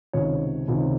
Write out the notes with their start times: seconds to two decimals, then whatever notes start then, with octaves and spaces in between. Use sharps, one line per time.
0.13 C#2 C3 D#3 C#5
0.68 C#2 C3 D#3